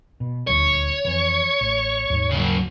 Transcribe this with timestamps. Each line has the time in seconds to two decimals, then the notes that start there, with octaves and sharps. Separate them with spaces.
0.20 B2
0.47 D#1 D2 C#5
1.05 F2 E3
1.61 A1
2.10 D#1 D#2 G#2
2.30 C#3 F#3